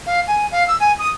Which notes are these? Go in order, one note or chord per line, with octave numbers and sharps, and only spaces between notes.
F5
G#5
F5
E6
G#5
D#6